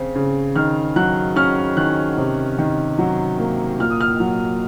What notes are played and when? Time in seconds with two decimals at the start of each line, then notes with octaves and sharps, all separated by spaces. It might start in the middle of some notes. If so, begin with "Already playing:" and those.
Already playing: C#3 C4
0.15 C#3
0.56 D#3 F6
0.96 F#3 F#6
1.36 C#4 F6
1.77 D#3 F#6
2.18 C3
2.58 D#3
2.98 F#3
3.39 A#3
3.79 A#2 F6
3.90 D#6
4.00 F6
4.20 F#3